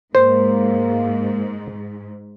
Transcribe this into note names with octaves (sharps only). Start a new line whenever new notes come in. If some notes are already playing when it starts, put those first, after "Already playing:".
G#2 A#3 C5